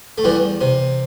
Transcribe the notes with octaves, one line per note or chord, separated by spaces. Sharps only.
A3
E2 E3 G3
C3